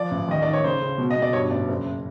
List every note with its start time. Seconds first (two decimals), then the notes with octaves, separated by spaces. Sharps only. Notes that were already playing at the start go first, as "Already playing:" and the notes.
Already playing: F3 D5
0.11 A1
0.28 D#2 D#5
0.42 D#3 D5
0.53 C#5
0.64 C#3 C5
0.82 C#2
0.98 B2
1.10 D#5
1.16 B2
1.22 D5
1.33 G2 C#5
1.51 A1 D5
1.68 F#1